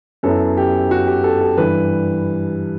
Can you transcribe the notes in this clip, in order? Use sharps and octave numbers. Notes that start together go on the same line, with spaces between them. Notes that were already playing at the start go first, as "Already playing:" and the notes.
F#2 F#3 B3 E4 A4
G4
F#4
G4
A4
A4
G2 E3 G3 B4